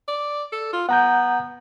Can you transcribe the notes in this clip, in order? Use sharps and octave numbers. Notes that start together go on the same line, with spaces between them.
D5
A4
F4
B3 F#5 A#5 G6